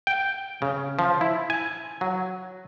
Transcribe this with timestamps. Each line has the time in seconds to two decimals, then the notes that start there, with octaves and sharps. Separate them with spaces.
0.07 G5
0.62 C#3
0.99 F3
1.21 E4
1.50 G#5
2.01 F#3